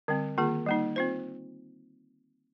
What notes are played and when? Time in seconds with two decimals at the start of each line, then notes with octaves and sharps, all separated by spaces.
0.08 D3 G3 C4
0.38 D#3 A#3 F4 G#4
0.66 G3 A#3 D#4
0.96 C4 F4 C5